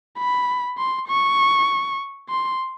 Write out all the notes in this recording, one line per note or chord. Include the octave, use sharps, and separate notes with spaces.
B5
C6
C#6
C6